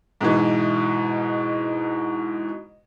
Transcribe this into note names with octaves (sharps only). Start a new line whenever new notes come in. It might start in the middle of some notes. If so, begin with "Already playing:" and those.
G#2 B2 E3